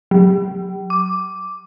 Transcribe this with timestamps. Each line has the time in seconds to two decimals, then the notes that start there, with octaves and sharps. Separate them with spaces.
0.11 F#3
0.90 D6